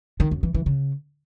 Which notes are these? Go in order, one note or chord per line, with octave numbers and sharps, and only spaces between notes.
D#3
F#2
E3
E3
C#3